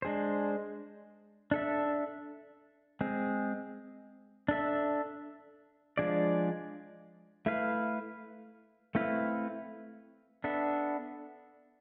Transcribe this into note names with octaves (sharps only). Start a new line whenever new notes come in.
G#3 D4 G#4 C5
D4 A4 E5
G#3 C4 G#4
D4 A4 E5
F3 G#3 D4 G#4 D5
A3 E4 B4 F5
A3 C4 E4 B4 F5
B3 D4 A4 E5